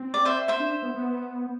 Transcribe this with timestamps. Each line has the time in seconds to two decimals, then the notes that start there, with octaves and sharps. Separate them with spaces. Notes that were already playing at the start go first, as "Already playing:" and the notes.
Already playing: C4
0.14 D5
0.25 C5 E5
0.48 C5 E5
0.60 D4
0.82 B3
0.95 B3